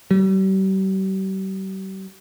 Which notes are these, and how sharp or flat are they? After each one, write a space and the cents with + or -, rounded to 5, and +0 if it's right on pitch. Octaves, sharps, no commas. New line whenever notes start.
G3 -40